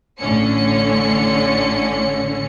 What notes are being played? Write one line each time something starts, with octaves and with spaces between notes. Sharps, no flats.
A1 A2 D3 C#4 C#7